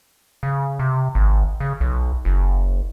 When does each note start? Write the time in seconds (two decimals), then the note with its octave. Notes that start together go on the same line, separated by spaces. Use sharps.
0.43 C#3
0.79 C3
1.15 G#1
1.60 C#3
1.80 B1
2.25 F#1